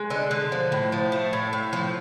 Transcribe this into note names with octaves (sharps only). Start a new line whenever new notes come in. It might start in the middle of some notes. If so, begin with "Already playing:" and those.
Already playing: G#3
D3 D#5
D3
F3
A2
F3
A3
A2
A2
F3